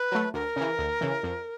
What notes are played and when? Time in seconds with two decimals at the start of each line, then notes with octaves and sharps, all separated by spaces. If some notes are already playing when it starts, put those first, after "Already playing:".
Already playing: B4
0.12 F#3 A3
0.34 D2 A#4
0.56 C#3 E3
0.78 D2
1.01 C#3 E3
1.23 F2